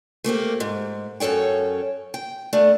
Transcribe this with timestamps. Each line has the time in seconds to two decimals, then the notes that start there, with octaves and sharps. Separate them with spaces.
0.24 A3 A#3 C4 G4
0.60 G#2
1.20 F#2 C#4 A4 C#5 G5
2.14 G5
2.53 A3 B3 D4